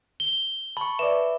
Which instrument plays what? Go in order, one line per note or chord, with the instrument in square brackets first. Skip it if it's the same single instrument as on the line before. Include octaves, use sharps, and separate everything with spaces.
[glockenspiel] G7
[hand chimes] A5 C#6 [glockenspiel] B5
[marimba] B4 D5 [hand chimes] E5 D6 [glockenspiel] E7